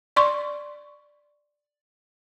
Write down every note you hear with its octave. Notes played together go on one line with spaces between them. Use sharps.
D5 C6 C#6